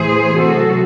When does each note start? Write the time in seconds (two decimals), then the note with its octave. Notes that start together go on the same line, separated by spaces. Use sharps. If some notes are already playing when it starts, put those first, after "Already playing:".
Already playing: A2 E3 A3 G#4 C5
0.36 C3 F#3 A3 F#4 A4